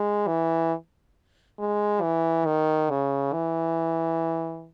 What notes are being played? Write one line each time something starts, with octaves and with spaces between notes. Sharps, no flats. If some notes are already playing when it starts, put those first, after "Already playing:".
Already playing: G#3
E3
G#3
E3
D#3
C#3
E3